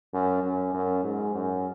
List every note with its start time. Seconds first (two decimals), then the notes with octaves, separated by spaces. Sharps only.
0.13 F#2
0.43 F#2
0.74 F#2
1.04 G#2
1.34 F#2